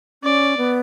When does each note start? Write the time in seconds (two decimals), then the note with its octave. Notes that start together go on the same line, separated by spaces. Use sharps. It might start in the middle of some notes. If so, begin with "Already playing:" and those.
0.23 C#4 D5
0.57 B3